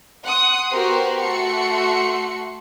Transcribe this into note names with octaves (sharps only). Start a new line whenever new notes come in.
F#5 C6 D#6
B3 F#4 G4 A#4 C5 C6
A3 F#4 C6 C#7